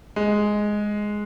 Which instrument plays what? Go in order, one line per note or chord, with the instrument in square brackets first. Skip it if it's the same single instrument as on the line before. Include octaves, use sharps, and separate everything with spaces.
[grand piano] G#3